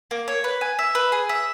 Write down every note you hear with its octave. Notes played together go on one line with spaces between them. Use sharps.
A#3
C#5
B4
G#5
E5
B4
G#4
E5